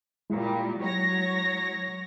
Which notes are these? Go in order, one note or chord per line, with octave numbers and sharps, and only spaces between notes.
A#2 G3 G#3 E4
F#3 C#5 A#6